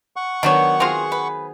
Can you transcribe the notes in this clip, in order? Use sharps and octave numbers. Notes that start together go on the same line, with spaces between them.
F#5 C#6
D#3 F#3 B3 D4 F#4 C#5
C4 F4 G#4 C5 A#5
B4